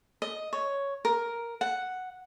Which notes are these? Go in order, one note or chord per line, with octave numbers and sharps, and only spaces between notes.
D#5
C#5
A#4
F#5